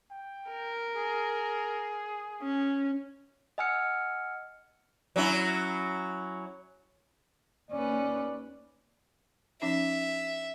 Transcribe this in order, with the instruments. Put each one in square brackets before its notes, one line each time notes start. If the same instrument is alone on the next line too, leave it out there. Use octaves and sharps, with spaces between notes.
[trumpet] G5
[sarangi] A#4
[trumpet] G#4
[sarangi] C#4
[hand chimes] D#5 F#5 G#5 E6 F6 C#7
[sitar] F#3 C#4 E4
[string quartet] D#2 C#4 B4 [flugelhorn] D5
[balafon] F3 C#4 D#4 [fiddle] E5